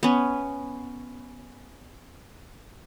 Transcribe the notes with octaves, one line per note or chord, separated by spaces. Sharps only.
B3 C#4